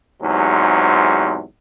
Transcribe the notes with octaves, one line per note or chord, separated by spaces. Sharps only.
E2 G#2 C3 F#3